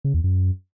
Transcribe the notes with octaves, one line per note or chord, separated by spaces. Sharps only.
C#3
E2
F#2